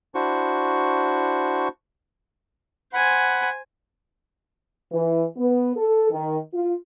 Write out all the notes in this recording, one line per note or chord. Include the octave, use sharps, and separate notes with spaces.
D4 E4 F#4 C5 C#6
C5 F#5 G#5 B5
E3
B3
A4
D#3
F4